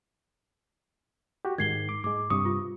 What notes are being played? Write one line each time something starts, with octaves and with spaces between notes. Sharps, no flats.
F#4 G4
G#2 D#3 G#6 C7 G7
D6
G#2 G#3 D6
G2 C3 C#6 D#6
F4